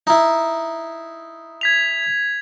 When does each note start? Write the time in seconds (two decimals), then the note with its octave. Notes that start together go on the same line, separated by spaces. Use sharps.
0.07 D#4 E4
1.61 G#6 B6 F7